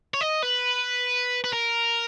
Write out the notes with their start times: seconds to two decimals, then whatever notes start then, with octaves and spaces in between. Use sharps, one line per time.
0.14 C#5
0.21 D#5
0.42 B4
1.44 B4
1.53 A#4